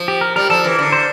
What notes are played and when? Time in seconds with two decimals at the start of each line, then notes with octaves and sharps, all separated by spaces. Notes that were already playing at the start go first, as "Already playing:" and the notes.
Already playing: F3
0.08 G4
0.21 A#4
0.36 G3 A#4
0.50 F3 A4
0.64 E3 A#4
0.79 D3
0.92 C5